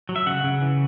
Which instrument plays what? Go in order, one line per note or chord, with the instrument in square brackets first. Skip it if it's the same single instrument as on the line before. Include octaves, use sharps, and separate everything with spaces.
[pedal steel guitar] F#3
E5
C#3 F#5
C#3
E3